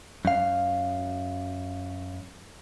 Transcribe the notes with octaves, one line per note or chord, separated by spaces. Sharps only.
F#2 F5